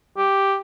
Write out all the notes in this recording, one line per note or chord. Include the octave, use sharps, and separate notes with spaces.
G4